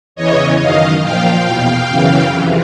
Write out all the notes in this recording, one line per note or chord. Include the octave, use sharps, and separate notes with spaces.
E2 C#3 E3 C#5 D#5
F#2 D#3 D#5 F5
A#2 F3 F5 G5
E2 B2
F#2 C#3 E3
F2 C3 E3